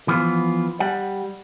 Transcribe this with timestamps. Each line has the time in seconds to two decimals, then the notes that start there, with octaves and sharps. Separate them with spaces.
0.08 E3 F3 B3 F4
0.80 G3 F#5